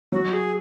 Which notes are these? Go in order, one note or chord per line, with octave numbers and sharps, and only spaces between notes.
F#3 F#4
G#4